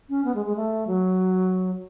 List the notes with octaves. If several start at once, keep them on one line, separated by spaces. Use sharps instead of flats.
C#4
B3
G#3
G#3
A3
F#3